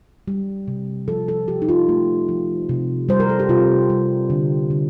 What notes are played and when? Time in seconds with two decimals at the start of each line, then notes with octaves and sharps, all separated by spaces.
0.28 G3
0.68 C3
1.08 F3 A4
1.28 A4
1.48 F3 G4
1.62 D#4
1.69 F4
1.89 A3
2.29 F3
2.69 C3
3.09 G3 C5
3.20 A#4
3.29 A4
3.40 G4
3.49 C3 F4
3.90 G3
4.30 D3
4.70 D3